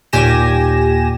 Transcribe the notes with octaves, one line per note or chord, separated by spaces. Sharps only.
D#2 A#2 G4 G#5 A#6 E7